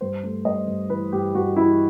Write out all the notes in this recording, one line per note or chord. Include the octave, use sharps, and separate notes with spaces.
G2 C5
A3
G2 D#5
G2
E3 B4
G2 G4
G2 F#4
E3 E4